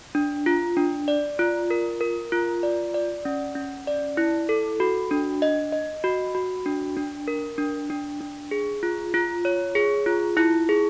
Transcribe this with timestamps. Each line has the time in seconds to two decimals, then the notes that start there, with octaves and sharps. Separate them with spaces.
0.15 D4
0.46 F4
0.77 D4
1.08 D5
1.39 F4
1.70 A#4
2.01 A#4
2.32 F4
2.63 D5
2.94 D5
3.25 C#4
3.55 C#4
3.87 D5
4.17 E4
4.49 A4
4.80 F#4
5.11 D4
5.42 D#5
5.73 D#5
6.04 F#4
6.35 F#4
6.66 D4
6.97 D4
7.28 A#4
7.58 D4
7.90 D4
8.21 D4
8.51 G#4
8.83 F4
9.14 F4
9.45 C#5
9.75 G#4
10.06 F4
10.37 E4
10.69 G#4